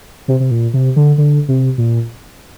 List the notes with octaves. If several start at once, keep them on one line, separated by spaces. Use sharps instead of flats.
C3
C3
A#2
C3
D3
D3
C3
A#2